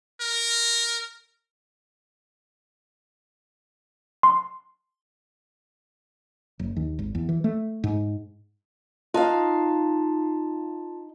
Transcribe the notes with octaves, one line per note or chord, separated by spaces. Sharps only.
A#4
C6
F#1
D#2
G#1
E2
E3
A3
G#2
D#4 F4 F5 A5